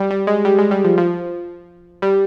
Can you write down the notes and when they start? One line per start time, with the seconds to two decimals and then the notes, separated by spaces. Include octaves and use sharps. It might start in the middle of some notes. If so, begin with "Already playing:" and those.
Already playing: G3
0.11 G3
0.27 G#3
0.45 G3
0.58 G#3
0.71 G3
0.85 F3
0.98 F3
2.02 G3